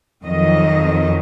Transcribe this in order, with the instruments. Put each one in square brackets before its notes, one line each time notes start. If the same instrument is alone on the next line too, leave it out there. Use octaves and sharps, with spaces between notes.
[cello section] F2 D#3 F#3 D#5